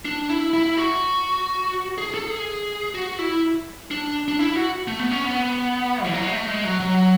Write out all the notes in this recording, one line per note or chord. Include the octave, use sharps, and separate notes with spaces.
D4
E4
E4
F#4
G#4
A4
G#4
F#4
E4
D4
D4
E4
F#4
A3
B3
C#4
B3
E3
F#3
G#3
A3
G#3
F#3
F#3